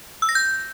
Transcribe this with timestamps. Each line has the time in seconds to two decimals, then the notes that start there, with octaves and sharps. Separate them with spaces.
0.22 E6
0.29 A#6
0.35 G6